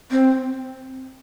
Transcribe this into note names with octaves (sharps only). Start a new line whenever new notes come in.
C4